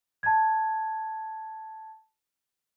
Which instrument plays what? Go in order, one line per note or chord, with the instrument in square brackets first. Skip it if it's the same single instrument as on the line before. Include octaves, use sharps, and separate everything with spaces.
[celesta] A5 G#6